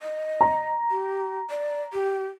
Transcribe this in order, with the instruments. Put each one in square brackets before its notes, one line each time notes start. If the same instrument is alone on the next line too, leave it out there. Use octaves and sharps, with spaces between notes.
[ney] D#5
[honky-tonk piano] A#5
[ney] G4
D5
G4